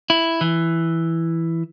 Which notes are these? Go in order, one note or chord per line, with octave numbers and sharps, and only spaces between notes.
E4
E3